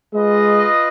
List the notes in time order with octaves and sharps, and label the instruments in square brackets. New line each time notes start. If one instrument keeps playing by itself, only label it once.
[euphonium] G#3 [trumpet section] F4 B4 D#5